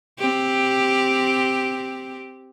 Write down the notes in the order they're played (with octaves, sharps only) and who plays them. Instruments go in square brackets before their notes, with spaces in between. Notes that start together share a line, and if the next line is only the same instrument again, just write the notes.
[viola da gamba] C4 G4